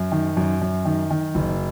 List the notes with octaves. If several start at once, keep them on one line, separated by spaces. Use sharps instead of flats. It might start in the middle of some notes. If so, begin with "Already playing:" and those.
Already playing: F#2
D#3
F#2
F#2
D#3
D#3
F#1